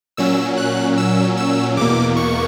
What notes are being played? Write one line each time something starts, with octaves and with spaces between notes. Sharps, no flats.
A#2 F#3 C#4 E6
F#6
E6
E6
E2 B2 A#3 D6
C#6